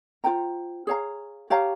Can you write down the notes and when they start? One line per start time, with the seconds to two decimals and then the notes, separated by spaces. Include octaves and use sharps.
0.24 F4 C5 G5 A#5
0.87 G#4 C#5 F5 A#5
1.50 G4 C#5 F5 A#5